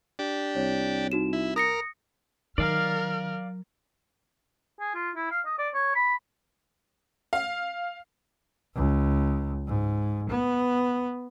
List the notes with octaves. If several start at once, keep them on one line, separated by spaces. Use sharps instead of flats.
D4 G4
C2 C#5
D#4 F#4 E7
E4
A#4 D#6 A#6 C#7
D#3 F#3 A#4 D5 F5 F6
G#4
F4
E4
F5
D#5
D5
C#5
B5
F5
C#2
G#2
B3